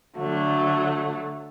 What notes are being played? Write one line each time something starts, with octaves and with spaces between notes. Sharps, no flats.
D3 F#3 A3